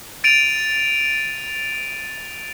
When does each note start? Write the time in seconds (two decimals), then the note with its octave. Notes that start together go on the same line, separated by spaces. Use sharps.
0.24 A6 D7 D#7 F7